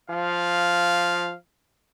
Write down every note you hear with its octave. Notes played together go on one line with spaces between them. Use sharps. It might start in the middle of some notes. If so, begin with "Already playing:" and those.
F3 F5